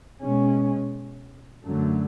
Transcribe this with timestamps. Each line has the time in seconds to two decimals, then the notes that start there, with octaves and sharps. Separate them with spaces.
0.22 B2 G#3 C#4
1.64 F#2 D3 F#3 A3